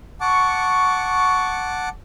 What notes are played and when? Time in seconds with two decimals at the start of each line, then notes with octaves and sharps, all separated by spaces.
0.21 F#5 A5 C#6 D6